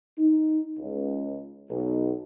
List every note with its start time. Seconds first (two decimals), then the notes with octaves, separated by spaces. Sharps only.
0.18 D#4
0.78 C#2
1.70 B1